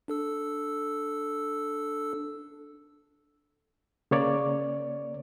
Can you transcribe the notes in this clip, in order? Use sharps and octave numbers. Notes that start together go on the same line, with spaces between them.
D4 A4 E6
C#3 A#3 C#5 D5